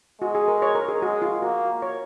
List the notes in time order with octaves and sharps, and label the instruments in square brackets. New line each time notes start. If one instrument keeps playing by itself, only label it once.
[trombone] G#3 [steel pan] F#4
[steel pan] G#4
A#4
C#5
A#4
G#4
[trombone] G#3 [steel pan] F#4
[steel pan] F4
[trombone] A#3 [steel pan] F#4
[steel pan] C#5